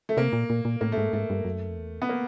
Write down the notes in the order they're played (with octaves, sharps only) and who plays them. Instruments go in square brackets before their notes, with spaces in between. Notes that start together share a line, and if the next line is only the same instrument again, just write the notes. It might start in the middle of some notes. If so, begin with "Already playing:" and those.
[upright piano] A3
[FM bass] C3 [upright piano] A#3
[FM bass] A#2
A#2
A#2
[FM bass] A2 [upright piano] A#3
[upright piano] A3
[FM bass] G#2
[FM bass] G#2 [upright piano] A3
[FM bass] G2
F#2
F2
E2
[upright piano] B3
A#3